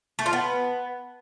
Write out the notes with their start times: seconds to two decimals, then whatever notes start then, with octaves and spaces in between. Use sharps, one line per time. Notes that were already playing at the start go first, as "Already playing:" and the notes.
0.19 A3
0.26 F4
0.33 B3